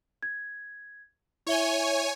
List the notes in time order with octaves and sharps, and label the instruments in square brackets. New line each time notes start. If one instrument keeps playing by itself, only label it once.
[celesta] G#6
[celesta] E4 E5 G7 [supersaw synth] C#5 G#5